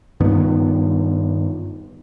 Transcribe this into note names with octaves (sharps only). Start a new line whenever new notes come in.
G2 D#3 B3